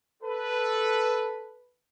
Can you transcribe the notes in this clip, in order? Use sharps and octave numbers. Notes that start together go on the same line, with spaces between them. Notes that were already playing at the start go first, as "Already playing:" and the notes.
A4 B4